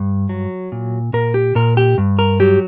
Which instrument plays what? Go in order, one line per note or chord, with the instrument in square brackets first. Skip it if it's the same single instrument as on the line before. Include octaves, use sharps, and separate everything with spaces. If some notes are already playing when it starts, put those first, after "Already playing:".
Already playing: [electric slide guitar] G2
F#3
A#2
A#2 A#4
G4
A#2 A#4
G4
G2
A#4
F#3 G4